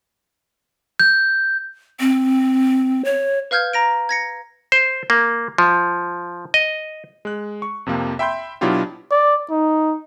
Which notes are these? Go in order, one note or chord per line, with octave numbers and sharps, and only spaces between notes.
G6
C4
C#5
B4 F5 F6 G6 G#6
A#5 A#6 D7
G#6 A#6 C#7
C5
A#3
F3
D#5
G#3 F#6
C#6
F2 C3 F3 A#3
E5 G5 B5 C6 G6
B2 F#3 D4 E4 F4 G4
D5
D#4